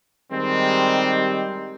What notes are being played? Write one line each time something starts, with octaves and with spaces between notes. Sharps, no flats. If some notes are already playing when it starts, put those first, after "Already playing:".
D#3 G3 G#3 C4